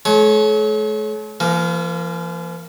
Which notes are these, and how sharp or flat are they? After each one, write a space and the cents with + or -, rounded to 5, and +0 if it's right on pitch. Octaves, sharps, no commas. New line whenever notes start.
A3 -45 C#5 +0
F3 -45 A#3 +0